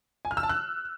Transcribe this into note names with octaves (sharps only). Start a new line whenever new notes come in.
G#5
F6
E6
A5
F#6